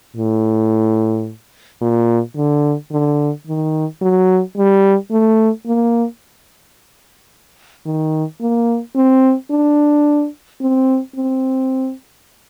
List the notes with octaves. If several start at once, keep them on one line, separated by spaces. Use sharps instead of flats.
A2
A#2
D3
D3
D#3
F#3
G3
A3
A#3
D#3
A#3
C4
D4
C4
C4